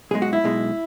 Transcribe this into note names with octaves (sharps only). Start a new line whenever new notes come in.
B1 B2 G#3 G#4
F#4
E4
B1 B2 G#3